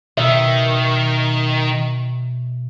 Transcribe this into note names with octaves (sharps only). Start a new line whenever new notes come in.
B2 D#3 E5